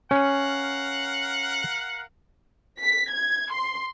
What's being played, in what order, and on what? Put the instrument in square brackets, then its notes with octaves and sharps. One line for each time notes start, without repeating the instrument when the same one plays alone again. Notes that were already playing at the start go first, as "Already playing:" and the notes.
[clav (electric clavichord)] C#4 [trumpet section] A#4 F5 F#5
[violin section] B6
G#6
C6